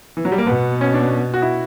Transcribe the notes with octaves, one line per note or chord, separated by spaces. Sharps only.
E3
F#3
G3
A#3
B2 B3
C#4
D4
F#4
E4